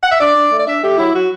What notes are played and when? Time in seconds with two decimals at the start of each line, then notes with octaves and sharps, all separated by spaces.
0.03 F#5
0.11 E5
0.20 D4 D5
0.35 D4
0.51 A3
0.59 D5
0.67 D4 E5
0.82 A3 G4
0.98 F#3 E4
1.13 F#3 F#4